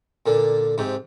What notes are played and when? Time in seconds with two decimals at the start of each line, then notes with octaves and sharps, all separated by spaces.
0.26 A#2 D3
0.78 G#2 C3